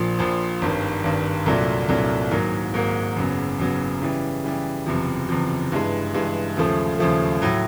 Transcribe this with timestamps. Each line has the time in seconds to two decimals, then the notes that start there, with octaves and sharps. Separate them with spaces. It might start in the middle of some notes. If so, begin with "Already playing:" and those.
Already playing: A#1 A#2 F3
0.19 A#1 A#2 F3
0.62 G#1 G2 D#3
1.04 G#1 G2 D#3
1.46 C2 A#2 F#3 A3 D4
1.89 C2 A#2 F#3 A3 D4
2.31 G#2 D#3 F#3 A#3
2.74 G#2 D#3 F#3 A#3
3.16 F#1 F#2 C#3 F#3 B3
3.59 F#1 F#2 C#3 F#3 B3
4.01 C#3 E3 G3
4.44 C#3 E3 G3
4.86 F#1 E2 C3 F3
5.29 F#1 E2 C3 F3
5.72 G2 E3 G#3
6.14 G2 E3 G#3
6.57 D#2 C#3 F3 A3
6.99 D#2 C#3 F3 A3
7.42 A2 F#3